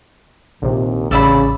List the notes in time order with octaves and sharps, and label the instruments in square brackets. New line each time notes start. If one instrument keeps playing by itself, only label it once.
[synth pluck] A#1 C3 [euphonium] D#2
[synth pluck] A1 E6 [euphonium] C#3 [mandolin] D5 E5 B5